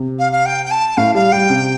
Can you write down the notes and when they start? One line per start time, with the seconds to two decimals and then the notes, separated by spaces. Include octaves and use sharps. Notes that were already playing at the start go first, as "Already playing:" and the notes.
Already playing: C3
0.19 F5
0.32 F5
0.46 G5
0.66 G5
0.71 A5
0.97 A2 F5
1.15 G3 F5
1.32 G3 G5
1.50 C3